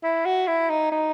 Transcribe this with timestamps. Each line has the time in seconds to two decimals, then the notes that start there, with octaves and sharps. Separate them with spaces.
0.03 E4
0.25 F#4
0.48 E4
0.70 D#4
0.92 D#4